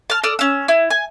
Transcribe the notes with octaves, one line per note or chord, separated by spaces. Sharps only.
A5 F6
A4 D5 D#6 F6
C#4 E6
E4
G#5